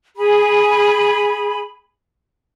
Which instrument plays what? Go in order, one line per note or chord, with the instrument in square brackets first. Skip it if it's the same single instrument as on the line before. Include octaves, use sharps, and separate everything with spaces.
[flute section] G#4 B5